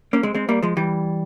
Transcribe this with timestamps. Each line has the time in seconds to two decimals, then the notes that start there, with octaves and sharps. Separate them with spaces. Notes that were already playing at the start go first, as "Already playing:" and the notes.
0.13 A#3 C#4
0.23 G#3 C4
0.35 G#3 C4
0.49 G3 A#3
0.62 F3 G#3
0.77 E3 G3